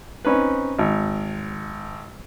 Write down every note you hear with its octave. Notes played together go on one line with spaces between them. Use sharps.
C4 C#4 D#4 B4
G#1